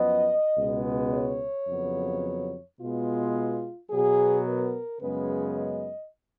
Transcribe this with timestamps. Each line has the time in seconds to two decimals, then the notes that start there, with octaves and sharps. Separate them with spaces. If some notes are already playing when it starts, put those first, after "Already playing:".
Already playing: F#2 F3 B3 D#5
0.57 C#2 B2 G#3 B3
1.13 C#5
1.68 F2 C#3 F#3 B3
2.79 B2 G#3 B3 F4
3.90 B2 F#3 B3 G#4
4.46 A#4
5.01 F#2 C#3 G#3 B3 B4
5.56 D#5